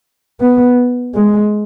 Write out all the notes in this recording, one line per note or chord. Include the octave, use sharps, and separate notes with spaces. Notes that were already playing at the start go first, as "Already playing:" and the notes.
B3
G#3